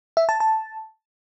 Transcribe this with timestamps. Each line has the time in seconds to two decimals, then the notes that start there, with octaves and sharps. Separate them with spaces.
0.17 E5
0.29 A5
0.40 A5